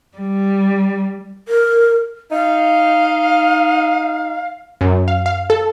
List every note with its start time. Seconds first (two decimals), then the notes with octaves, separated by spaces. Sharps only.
0.18 G3
1.48 A#4
2.31 D#4 F5
4.81 F#2
5.08 F5
5.26 F5
5.50 A4